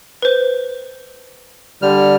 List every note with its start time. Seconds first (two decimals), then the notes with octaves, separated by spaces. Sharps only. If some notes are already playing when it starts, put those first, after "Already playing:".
0.22 B4 C5
1.82 D3 G3 F6